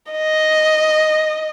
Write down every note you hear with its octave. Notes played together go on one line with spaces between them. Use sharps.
D#5